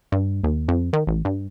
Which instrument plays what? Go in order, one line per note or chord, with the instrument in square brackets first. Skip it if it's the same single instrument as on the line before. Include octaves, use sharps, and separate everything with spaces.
[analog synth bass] G2
D#2
F2
D#3
A1
G2